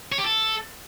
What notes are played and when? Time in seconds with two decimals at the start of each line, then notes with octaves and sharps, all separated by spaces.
0.12 C#5
0.18 G4
0.24 A4